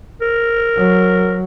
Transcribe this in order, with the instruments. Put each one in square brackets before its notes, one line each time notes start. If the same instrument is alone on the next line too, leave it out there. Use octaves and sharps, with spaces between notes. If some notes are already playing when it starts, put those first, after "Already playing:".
[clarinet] A#4
[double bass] F#3